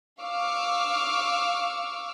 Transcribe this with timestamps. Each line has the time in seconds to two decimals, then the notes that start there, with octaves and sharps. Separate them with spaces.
0.20 F5 C#6 D6 E6 F6